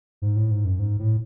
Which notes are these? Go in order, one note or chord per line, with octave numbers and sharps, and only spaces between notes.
G#2
A2
G#2
F#2
G#2
A2